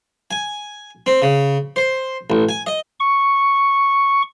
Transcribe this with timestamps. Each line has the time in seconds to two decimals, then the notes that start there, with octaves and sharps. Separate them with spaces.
0.31 G#5
1.06 C4
1.22 C#3
1.76 C5
2.30 A1
2.49 G#5
2.67 D#5
3.00 C#6